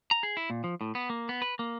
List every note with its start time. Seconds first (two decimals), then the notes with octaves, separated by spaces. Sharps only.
0.11 A#5
0.23 G#4
0.37 E4
0.50 A#2
0.64 F3
0.81 A2
0.95 B3
1.10 A#3
1.29 B3
1.42 B4
1.59 A#3